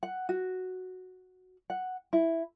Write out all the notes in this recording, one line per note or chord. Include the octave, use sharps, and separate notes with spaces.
F#5
F#4
F#5
E4